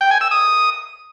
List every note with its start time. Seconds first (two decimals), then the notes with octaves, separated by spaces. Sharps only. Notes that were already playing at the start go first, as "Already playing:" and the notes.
0.01 G5
0.11 G#5
0.21 E6
0.31 D#6